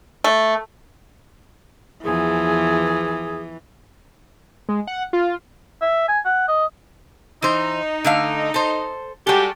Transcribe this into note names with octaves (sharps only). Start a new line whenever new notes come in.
A3
E2 E3 F3 G#4
G#3
F#5
F4
E5
G#5
F#5
D#5
E3 D#4 C5
D3 A3 F5
A4 C5
G3 G#3 F#4 G4 A4